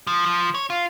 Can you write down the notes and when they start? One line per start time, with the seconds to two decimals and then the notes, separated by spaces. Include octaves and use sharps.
0.07 F3
0.26 F3
0.55 C#5
0.70 F4